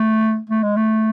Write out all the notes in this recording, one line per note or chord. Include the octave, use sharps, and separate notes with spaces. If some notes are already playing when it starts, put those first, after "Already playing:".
Already playing: A3
A3
G#3
A3